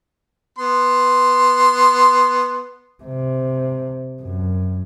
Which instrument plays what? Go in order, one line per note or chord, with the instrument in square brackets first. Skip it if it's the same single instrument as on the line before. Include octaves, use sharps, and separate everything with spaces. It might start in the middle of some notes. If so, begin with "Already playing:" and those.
[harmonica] B3 C6
[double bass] C3
F#2